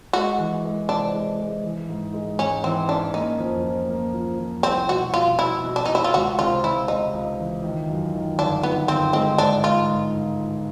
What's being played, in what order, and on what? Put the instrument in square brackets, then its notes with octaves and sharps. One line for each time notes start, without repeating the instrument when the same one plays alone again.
[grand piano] G#3 [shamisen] F#4
[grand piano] E3
G#3
[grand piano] C3 [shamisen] D4
[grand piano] G#3
G#3
E3
G#2
G#3
[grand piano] G#2 [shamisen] C#4
[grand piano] E3 [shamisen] C4
[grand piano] C#4 [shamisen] D4
[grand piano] A#3 [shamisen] D#4
[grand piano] F2
F3
A#3
F3
F2
[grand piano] C2 [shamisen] C4
[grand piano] B2 [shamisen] F#4
[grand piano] B2 [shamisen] F4
[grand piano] B2 [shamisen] E4
[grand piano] B2
[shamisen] D4
[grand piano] B2 [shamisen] D#4
[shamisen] E4
F4
[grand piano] C#2 [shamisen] F#4
[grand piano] C3 [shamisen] F4
[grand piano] C#2 [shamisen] E4
[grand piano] C#2 [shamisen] D#4
[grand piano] C#2
E3
D#3
F#2
D#3
[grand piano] G1 [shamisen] D4
[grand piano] D#3 [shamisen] B3
[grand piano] G1 [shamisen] C4
[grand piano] G#3 [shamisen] C4
[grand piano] G#2 [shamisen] D4
[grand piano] G#2 [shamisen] F4
[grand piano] G#2